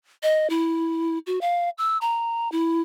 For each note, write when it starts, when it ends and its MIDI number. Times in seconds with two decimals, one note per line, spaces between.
0.23 0.48 75
0.50 1.19 64
1.27 1.41 66
1.41 1.70 77
1.78 1.98 88
2.01 2.50 82
2.52 2.82 64